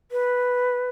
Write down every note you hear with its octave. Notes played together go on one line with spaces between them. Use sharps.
B4